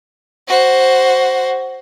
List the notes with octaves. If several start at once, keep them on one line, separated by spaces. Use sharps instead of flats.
F#4 C5